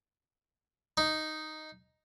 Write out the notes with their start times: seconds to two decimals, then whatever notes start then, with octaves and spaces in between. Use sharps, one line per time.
0.97 D#4